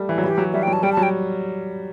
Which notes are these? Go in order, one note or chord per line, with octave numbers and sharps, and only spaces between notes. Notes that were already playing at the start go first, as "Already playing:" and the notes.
Already playing: G3 A3
E3
F#3
E3 G4
F#3
G3 E5
G5
F#3
A5
G3 G5
A5
F#3
G5